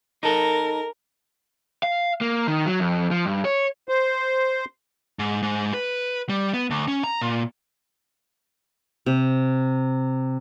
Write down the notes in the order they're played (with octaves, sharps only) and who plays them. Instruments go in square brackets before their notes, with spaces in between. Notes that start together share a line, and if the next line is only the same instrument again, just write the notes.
[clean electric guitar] D#4 A4 [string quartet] A#4
[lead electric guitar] F5
A#3
D#3
F#3
F2
F3
G2
C#5
[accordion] C5
[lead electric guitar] G#2
G#2
B4
G3
B3
D2
C#4
A#5
A#2
[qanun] C3